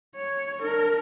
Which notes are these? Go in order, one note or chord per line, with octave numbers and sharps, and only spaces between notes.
C#5
D4 A#4